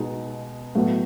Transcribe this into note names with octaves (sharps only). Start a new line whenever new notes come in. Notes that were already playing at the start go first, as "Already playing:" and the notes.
Already playing: B2 G#3 D#4
A2 F#3 B3